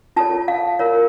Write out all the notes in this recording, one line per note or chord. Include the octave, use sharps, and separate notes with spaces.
F4 A4 C#5 A5
F5
F4 A#4 C#5